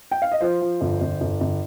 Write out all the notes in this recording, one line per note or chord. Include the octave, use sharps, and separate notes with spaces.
G5
F5
D#5
F3 C5
F3
G1
G1
G1
G1